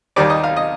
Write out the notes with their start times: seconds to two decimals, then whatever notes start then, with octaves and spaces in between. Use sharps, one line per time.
0.16 D#2 D#3 G3 D5
0.30 D#5
0.44 F5
0.56 D#5